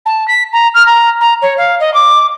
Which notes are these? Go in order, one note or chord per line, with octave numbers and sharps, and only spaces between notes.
A5
B6
A#5
F6
A#5
A#5
C#5
F5
D#5
D6